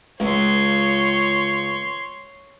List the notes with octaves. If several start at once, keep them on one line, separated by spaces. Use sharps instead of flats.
C#2 C#5 C6